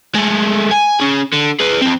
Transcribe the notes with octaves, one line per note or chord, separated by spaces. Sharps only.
G#3 A3
G#5
C#4 G#4
D3
G#4 B4
F3 C4